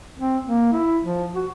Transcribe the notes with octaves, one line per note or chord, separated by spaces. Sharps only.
C4
A#3
E4
F3
F#4